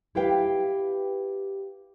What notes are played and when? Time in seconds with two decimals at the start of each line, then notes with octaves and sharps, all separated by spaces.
0.15 E4 G4 B4 F5 G5